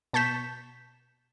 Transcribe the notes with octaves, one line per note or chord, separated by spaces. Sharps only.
B2 A5 C#6 G6 B6 E7